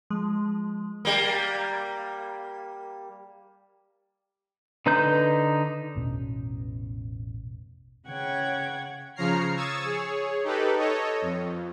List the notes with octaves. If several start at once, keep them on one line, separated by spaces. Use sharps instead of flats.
F3 G#3
G3 A#3
D3 D#4 B4 A#5 G6
A1 E2 B2 C#4
C#3 C#5 F#5 G5 G#6
C#3 F3 C#5 A#5 F6 C7
C#6 D#6 E6 G#6 A6
G#4 C#5
D#4 G4 A4 B4
A4 C#5 D#5
F2